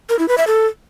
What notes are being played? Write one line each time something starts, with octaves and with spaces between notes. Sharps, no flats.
A#4
E4
B4
E5
A4